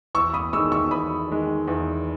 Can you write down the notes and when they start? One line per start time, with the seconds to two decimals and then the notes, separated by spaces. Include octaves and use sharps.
0.15 E2 C#6 E6
0.34 B5 D#6
0.53 G#3 C#6 E6
0.57 D#3
0.72 C#6 E6
0.91 E2 B5 D#6
1.30 D#3 G#3
1.68 E2